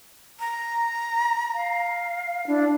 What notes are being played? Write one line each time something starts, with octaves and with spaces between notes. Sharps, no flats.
A#5
F5
D4 E4